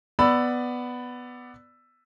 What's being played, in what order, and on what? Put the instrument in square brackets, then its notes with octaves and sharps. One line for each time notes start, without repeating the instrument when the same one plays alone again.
[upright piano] B3 D5 B5 E6